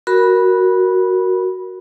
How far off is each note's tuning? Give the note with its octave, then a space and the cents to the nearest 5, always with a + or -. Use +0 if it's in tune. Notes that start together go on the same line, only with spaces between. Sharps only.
F#4 +0 A#4 +0 B5 -10